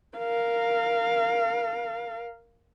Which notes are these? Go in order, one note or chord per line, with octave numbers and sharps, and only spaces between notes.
A#4 F5